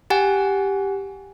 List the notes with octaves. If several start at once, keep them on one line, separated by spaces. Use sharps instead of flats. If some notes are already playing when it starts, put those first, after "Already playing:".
G4 F#5 G#5